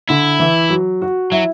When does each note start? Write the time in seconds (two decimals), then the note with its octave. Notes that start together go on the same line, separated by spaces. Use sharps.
0.09 D3 E4
0.40 E3
0.70 F#3
1.02 F#4
1.32 F#3 E4